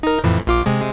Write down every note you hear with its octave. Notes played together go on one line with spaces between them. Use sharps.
D#4 A#4
F2 A2 E3
A#1 F4 D6
C3 G#3